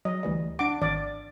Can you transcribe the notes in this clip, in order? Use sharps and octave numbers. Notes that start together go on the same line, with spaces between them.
F#3 D#5
D2 E3 G3
D4 F#5 D6
G#1 D5